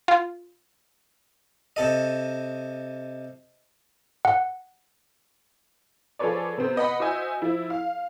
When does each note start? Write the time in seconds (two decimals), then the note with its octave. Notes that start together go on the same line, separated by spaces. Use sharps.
0.08 F4
1.76 C3 A4 D#5
4.25 F#5
6.19 F3 G#4 A4 B4 C#5 D5
6.58 C3 B3 C4
6.76 B4 D#5 F#5 B5
7.00 F#4 C5 D#5 E5 G#5
7.42 F3 E4
7.70 F5